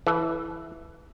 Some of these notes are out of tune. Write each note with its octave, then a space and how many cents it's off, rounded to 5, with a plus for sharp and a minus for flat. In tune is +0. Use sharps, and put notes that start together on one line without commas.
E3 +0 A4 -30